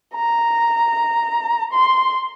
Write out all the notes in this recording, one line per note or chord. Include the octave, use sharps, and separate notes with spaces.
A#5
C6